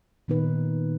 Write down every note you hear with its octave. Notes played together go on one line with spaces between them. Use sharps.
A#2 D#3 B3 D#4 B4